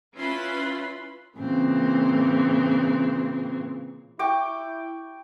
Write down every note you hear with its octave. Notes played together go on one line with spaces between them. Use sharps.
C#4 E4 F4 B4 B5 C6
A#2 C#3 E3 C4
E4 G5 C#6 D6